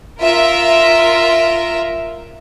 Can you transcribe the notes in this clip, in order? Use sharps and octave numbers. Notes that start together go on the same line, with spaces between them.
F4 A#4 E5